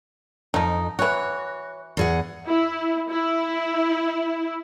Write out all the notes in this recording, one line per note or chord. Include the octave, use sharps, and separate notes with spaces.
F2 F3 D#4
E3 F#4 C#5
E2 G#4 F#5
E4
E4